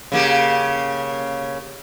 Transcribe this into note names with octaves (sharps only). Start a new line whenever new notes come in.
C#3 A#3 G4